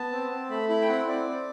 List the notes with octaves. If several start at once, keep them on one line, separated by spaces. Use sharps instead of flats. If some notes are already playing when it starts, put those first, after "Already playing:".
Already playing: B3 A5
C4
C4
A3 B5
E4 B5
G5
C4 F#5
C4 D5
C4